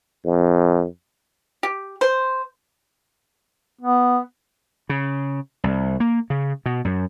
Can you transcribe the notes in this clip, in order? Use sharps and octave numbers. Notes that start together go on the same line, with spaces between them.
F2
G4
C5
B3
C#3
C2
A#3
C#3
B2
F#2